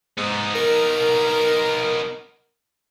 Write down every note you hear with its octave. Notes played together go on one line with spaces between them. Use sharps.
G#2 B3 D#4
A#4